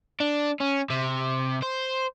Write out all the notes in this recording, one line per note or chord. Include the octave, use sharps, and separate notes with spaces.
D4
C#4
C3
C5